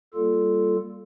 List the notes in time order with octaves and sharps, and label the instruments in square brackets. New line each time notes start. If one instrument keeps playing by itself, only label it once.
[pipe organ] G3 A#3 F4 A4